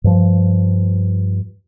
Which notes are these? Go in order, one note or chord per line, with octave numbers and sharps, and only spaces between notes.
G2 F3